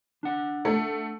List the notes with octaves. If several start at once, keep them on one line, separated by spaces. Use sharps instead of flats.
D4 F#5
A3